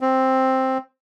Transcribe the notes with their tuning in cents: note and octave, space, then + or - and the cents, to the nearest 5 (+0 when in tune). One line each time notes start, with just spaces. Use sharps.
C4 +5